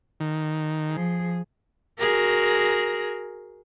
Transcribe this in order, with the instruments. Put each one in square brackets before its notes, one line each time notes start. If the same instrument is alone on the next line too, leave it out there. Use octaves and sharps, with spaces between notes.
[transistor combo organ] D#3
[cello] F3 G#4
[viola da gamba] F#4 G#4 A#4